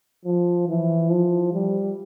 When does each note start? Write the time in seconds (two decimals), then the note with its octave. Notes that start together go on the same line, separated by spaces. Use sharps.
0.25 F3
0.68 E3
1.10 F3
1.53 G3